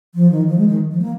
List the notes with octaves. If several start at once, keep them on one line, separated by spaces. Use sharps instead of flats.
F3
D#3
F3
G#3
D#3
F3
A#3